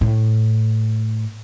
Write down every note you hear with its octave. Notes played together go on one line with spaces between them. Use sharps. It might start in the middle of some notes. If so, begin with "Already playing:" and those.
A2